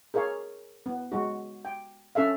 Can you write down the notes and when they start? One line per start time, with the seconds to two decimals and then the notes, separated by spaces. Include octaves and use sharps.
0.14 G#4 A#4 C#5 F5
0.86 B3
1.12 G#3 F#4
1.65 G5
2.15 C#4 A4 E5 F5